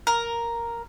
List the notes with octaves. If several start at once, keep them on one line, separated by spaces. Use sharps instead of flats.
A#4